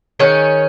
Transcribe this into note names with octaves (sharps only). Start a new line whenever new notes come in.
D#3 G#3 C#4